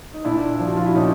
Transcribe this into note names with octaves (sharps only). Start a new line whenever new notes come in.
D#4
A#2 D4 E4
F3
F#4
F4
E4
A#2 C#4 D#4